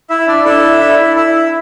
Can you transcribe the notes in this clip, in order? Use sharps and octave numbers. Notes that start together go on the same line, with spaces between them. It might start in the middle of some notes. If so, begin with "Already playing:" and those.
E4 E5
D4 D5
D4 E4 A4 E5
E4 E5
E4 E5